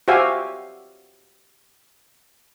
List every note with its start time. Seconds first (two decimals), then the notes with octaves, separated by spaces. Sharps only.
0.08 F#4 G4 C5 E5 F5 G#5